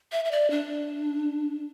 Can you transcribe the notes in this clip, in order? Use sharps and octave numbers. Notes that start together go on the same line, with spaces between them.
E5
E5
D5
D4